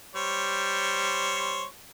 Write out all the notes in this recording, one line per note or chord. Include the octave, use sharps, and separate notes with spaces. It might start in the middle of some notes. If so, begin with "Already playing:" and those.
G3 C5 C#5